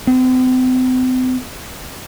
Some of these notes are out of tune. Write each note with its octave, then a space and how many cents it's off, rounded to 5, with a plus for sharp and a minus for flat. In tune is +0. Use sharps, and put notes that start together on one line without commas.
C4 -40